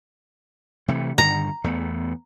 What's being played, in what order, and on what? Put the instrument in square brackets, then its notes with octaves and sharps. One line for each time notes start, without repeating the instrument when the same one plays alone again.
[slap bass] C3 E3 A3
[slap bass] G2 D3 D#3 [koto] A#5
[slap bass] E2 A3 B3